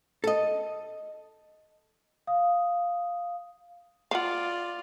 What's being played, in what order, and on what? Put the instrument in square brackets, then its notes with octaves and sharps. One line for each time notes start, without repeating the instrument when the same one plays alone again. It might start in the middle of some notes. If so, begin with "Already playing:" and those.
[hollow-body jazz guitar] A4 D#5
[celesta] F5 D#6
[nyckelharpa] F4 D5 [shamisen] F5 F#5